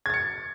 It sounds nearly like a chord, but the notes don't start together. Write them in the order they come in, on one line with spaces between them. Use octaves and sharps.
G#6 A6 C#7